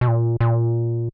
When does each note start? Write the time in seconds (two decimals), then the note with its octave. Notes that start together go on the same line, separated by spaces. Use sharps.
0.01 B2
0.08 A#2
0.41 A#2